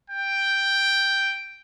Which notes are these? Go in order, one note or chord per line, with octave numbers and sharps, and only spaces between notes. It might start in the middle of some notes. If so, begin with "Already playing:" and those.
G5